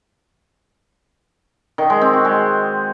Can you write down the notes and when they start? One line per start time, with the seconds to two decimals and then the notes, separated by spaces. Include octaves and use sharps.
1.78 D#3
1.90 G#3
2.01 C4
2.13 F#4
2.25 G#3